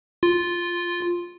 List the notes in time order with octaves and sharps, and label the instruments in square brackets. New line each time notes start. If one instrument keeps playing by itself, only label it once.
[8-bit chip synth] F4